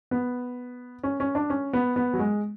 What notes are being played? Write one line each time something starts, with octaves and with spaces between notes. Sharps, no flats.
B3
C#4
C#4
D4
C#4
B3
B3
F#3
G#3